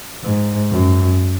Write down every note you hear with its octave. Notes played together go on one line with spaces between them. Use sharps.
G#2
F#2